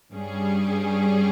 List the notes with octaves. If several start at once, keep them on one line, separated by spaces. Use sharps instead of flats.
G2 G3 C#4 G#4